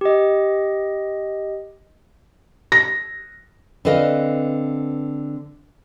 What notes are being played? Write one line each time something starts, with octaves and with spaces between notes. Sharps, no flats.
G4 D#5
A#6
D3 C4 B4 D#5 F5